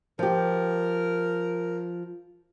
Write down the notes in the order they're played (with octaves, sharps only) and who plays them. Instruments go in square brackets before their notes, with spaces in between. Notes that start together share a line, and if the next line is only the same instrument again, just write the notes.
[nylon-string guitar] F3 G4 [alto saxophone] A#4